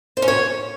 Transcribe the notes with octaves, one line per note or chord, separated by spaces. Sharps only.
C5
C#4
C#5